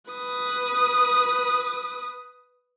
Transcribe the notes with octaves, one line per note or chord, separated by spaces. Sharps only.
B4 D#6